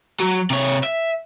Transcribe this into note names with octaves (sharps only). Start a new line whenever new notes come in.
F#3
C3 C#5
E5